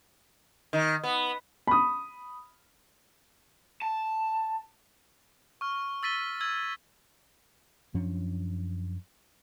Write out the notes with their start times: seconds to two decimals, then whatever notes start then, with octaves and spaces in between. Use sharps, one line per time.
0.73 D#3
1.04 B3
1.67 B5 D#6
3.82 A5
5.61 C#6 F6
6.03 E6 A6 B6 D#7 G7
6.41 E6 G#6
7.94 F#2 F3 C#4 D4